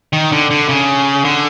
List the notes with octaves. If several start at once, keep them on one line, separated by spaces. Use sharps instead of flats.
D#3
D3
D3
C#3
D3